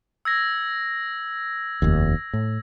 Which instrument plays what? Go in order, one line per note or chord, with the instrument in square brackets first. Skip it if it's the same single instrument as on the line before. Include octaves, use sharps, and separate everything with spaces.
[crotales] E6 G#6 A#6
[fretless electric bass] F1 D#2
A2